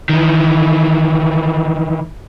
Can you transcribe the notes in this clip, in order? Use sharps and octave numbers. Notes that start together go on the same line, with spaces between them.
D#3 E3